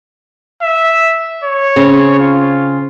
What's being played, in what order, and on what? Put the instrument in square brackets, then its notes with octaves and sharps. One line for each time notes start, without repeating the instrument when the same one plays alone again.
[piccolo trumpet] E5
C#5
[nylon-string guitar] C#3 C4
[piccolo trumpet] F4